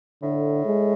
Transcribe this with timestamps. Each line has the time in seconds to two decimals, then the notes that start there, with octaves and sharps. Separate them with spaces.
0.22 A2 D3
0.65 G#3